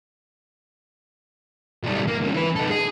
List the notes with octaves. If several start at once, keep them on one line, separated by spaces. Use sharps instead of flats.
B1 G3
A#3
G#2 C#3
E3 B4
D#4 A4
G#4